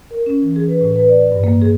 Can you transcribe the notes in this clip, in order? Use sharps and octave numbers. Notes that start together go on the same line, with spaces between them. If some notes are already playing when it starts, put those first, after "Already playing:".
A#4
C#4
E3
G#4
B4
A2
B4
D5
G2
A#3
G#4